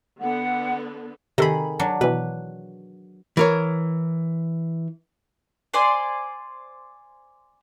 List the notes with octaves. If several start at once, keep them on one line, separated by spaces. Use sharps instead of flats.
D3 B3 A4 F#5
C3 D#3 G#4 A4 B5
F#3 D4
B2 E3 B4
E3 A#4 C#5
C5 D5 G#5 C6